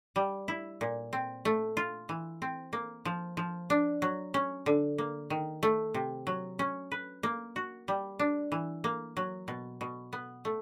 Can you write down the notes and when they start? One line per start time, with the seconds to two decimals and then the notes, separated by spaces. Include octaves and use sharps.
0.16 G3
0.48 E4
0.81 A#2
1.13 C4
1.45 A3
1.77 F4
2.09 E3
2.42 C4
2.73 A#3
3.05 F3
3.37 F3
3.70 D4
4.02 F#3
4.34 C#4
4.66 D3
4.98 A#3
5.30 D#3
5.63 A3
5.94 C3
6.27 F#3
6.59 C#4
6.92 B4
7.23 A#3
7.56 F#4
7.88 G3
8.19 D4
8.52 E3
8.84 A#3
9.17 F#3
9.48 B2
9.81 B2
10.13 B3
10.45 A3